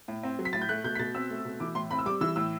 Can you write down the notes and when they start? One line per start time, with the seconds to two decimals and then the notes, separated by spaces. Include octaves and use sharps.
0.08 A2
0.23 C4
0.39 F#3
0.45 B6
0.53 A2 A6
0.61 G6
0.69 A3 F#6
0.84 B2 G6
0.95 B6
0.99 B2 A6
1.15 C4 E6
1.30 A3
1.45 B2
1.60 E3 D6
1.75 A2 C6
1.91 C4 B5
1.99 E6
2.06 G3 D6
2.21 E3 E6
2.36 A2 E6